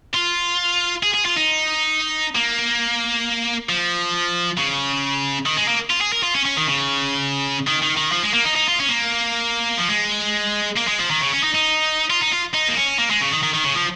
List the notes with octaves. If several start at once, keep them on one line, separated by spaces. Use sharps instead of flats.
F4
G#4
G#4
F4
D#4
A#3
F3
C#3
D#3
G#3
A#3
F4
G#4
A#4
F4
C#4
C#4
D#3
C#3
D#3
D#3
D#3
F3
G#3
A#3
D#4
D#4
F4
C#4
A#3
F3
G#3
A#3
G#3
F3
D#3
C#3
C#4
D#4
D#4
F4
D#4
F4
D#4
A#3
C#4
A#3
G#3
C#3
D#3
D#3
D#3
C#3
F3